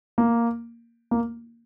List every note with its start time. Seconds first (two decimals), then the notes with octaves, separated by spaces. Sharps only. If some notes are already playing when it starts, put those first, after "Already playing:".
0.18 A#3
1.11 A#3